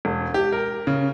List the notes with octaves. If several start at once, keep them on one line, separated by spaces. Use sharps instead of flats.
E1
G4
A#4
C#3